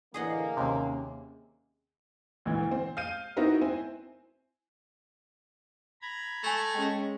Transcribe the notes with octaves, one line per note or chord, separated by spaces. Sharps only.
A2 D3 E3 A#3 G#4 D#5 F#5
D#2 C3 C#4
D2 A#2 E3
C4
F5 G6 D#7
B3 C4 D#4 E4 F#4 A#4
C4 E4 G#5
A#5 B5 G#6
A3 G#5 C#6
G#3 C#4 G5